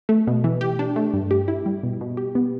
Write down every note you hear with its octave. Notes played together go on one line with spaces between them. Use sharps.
A3
B2
E3
G4
D4
A3
G2
G4
E4
G3
B2
B2
G4
B3